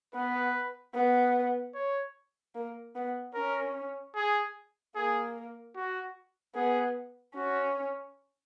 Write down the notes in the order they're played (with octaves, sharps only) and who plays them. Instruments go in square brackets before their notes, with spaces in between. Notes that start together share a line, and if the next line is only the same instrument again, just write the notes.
[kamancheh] B3 [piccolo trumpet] B4
[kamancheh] B3
[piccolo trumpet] C#5
[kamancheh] A#3
B3
[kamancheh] C#4 [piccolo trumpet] A#4
[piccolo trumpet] G#4
[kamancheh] A#3 [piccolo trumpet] G#4
[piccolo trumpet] F#4
[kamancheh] B3 [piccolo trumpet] G#4
[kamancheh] C#4 [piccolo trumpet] F#4